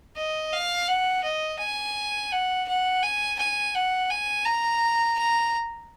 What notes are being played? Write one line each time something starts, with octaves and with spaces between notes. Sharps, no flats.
D#5
F5
F#5
D#5
G#5
F#5
F#5
G#5
G#5
F#5
G#5
A#5
A#5